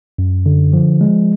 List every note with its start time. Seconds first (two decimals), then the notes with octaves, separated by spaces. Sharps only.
0.19 F#2
0.46 D3
0.73 F3
1.01 G#3